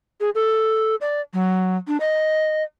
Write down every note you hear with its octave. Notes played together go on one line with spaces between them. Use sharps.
G#4
A4
D5
F#3
D4
D#5